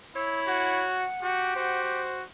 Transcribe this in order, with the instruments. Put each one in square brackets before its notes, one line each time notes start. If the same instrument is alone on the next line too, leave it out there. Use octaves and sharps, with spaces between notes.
[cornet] E4 [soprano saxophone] C#5 [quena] E6
[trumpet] F#4 [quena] F#5
[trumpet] F#4 [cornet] G4
[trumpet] F#4 [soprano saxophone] C5